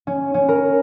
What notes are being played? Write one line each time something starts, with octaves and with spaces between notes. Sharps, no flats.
C#4
C#4
A#4